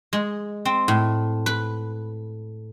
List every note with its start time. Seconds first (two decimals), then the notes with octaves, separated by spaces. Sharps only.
0.13 G#3
0.65 C4
0.88 A2
1.46 B4